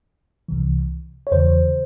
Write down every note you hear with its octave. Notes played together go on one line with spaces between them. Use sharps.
C2 C3 E3
C#5
E2 C#3 E3 C5